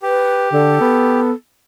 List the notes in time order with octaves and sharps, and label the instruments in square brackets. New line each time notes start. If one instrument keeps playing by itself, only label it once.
[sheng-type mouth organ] G4 [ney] B4
[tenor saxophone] D3 [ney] A4
[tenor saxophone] B3